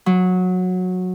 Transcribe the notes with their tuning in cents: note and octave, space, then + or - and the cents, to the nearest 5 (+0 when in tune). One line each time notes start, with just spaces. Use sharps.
F#3 -15